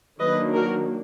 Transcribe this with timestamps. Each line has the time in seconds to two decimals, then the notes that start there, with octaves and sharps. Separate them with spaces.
0.20 D#3 F#3 A#3 D4 B4 D#5
0.55 F#4 A#4